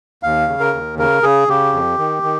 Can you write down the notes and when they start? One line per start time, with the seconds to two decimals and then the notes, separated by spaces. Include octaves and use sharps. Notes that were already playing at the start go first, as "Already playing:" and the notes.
0.23 D#2 F5
0.48 C#3
0.60 A#4
0.73 D#2
0.98 C#3 A#4
1.23 C#3 G#4
1.48 C#3 G4
1.73 F2
1.98 D#3
2.23 D#3